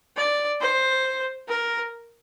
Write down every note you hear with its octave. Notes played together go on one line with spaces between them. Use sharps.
D5
C5
A#4